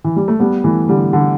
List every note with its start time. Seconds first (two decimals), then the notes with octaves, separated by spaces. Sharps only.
0.04 E3
0.16 G3
0.28 A3
0.40 G3 B3
0.64 E3 A3
0.89 D3 G3
1.13 D3